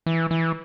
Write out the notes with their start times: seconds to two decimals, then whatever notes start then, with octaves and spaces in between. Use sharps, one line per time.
0.06 E3
0.31 E3